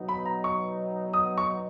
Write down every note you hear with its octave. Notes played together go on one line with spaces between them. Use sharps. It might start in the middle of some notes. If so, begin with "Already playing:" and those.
Already playing: B2 F#3 B3 D#4
B5
A#5
C#6
D#6
C#6